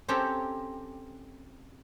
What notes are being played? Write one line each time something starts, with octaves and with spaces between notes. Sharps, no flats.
C4 C#4 G4 A4 G5 A#5